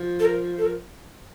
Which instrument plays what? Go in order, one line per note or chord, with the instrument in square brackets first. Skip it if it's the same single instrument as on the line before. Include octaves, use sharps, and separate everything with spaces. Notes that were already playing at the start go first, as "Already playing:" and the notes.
Already playing: [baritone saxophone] F3
[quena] A4
A#4
A4
A#4